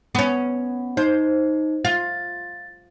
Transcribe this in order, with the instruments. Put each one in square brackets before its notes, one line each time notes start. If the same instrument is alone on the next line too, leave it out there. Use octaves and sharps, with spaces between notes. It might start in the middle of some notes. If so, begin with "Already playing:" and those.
[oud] B3 C#4
[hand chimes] D#4 [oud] C5
[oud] F4 [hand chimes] A6